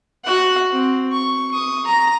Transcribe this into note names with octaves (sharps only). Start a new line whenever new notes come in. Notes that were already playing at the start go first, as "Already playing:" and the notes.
F#4 F#5
C4
C#6
C#6 D#6
A#5